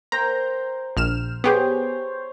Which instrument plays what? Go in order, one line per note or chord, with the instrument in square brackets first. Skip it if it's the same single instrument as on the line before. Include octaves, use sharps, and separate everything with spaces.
[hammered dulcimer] A#4 C5 G5 [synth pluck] A#5
[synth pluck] A#1 F6 E7
[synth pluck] B3 G4 G#4 [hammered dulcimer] C5 C#5